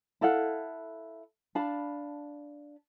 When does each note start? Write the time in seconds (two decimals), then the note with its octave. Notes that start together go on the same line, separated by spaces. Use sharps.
0.21 E4 A4 F5 F#5
1.55 D4 F5 A5 B5